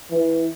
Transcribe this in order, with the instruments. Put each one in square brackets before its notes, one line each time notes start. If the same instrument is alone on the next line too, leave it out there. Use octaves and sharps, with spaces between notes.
[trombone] E3